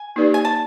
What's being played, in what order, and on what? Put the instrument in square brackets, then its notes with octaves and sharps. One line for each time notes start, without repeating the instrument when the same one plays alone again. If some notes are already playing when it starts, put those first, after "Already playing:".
Already playing: [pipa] G#5
[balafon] A#3 D#4 G4 B4 D5
[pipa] G#5
A5